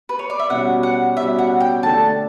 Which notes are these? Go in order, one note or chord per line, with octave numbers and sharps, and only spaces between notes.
B4
C#5
D5
E5
B2 G3 C#4 F#4 F#5
F#5
B2 G3 C#4 F#4 E5
F#5
G5
D3 A3 D4 A4 A5